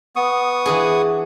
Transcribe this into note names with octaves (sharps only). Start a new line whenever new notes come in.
B3 C#6 D#6
E3 D4 G#4